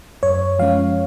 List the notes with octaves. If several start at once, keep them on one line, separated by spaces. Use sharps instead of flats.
F#2 C#5
F3 G#3 C#4 F5